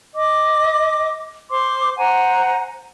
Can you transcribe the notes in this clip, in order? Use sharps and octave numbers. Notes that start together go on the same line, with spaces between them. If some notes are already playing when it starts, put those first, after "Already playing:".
D#5 D6
C5 C6 D6
C5 F#5 G#5 A#5